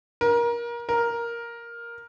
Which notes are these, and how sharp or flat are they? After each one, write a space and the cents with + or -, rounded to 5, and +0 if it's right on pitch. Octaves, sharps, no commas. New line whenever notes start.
A#4 +25
A#4 +5